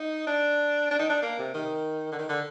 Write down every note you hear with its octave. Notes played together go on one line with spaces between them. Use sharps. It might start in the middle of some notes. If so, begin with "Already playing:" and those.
Already playing: D#4
D4
D4
D#4
D4
A#3
C3
D#3
D3
D#3
D3